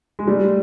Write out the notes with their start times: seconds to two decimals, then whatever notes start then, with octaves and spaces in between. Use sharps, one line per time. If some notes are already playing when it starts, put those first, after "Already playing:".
0.19 G#3
0.27 G3 A3